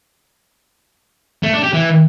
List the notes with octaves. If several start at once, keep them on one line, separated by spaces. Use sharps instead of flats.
A3
D4
G4
E3